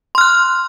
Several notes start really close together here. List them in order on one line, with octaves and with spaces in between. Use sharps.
C6 F6 F#6